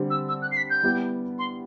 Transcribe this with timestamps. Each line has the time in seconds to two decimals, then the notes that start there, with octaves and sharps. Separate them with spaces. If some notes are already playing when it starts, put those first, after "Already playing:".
Already playing: D3 G3 C4
0.10 E6
0.28 E6
0.41 F#6
0.51 C7
0.56 B6
0.70 G6
0.83 G3 B3 E4 G4
1.38 C6